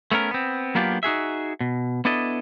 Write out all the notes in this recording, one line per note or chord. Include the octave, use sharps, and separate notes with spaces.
A3 B3 C#4 A#4
B3 C4
F#3 A#3 B3 D4 F4 G4
D#4 F#4 G#4 E5
B2
B3 D4 E4 A4 D#5